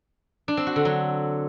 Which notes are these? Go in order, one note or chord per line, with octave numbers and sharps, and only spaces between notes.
D4
C4
F#4
D3
F#3